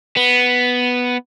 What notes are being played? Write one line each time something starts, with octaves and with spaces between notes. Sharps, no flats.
B3